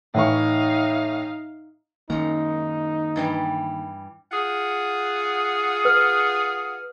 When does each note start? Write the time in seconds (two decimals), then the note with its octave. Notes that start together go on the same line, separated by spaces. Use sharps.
0.14 A2 E3 D#4 F5 C#6
2.10 F#2 D#3 G#3 A#3 D#4 A#5
3.16 G2 E3 G3
4.31 F4 G#4 F#5
5.85 B4 F6